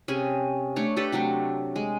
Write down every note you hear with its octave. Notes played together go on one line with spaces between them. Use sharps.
C3 C#4 G#4 G#5
A3 D4 C#5
D4 G4 A4 B4
C3 F#3 A3 D4
G#3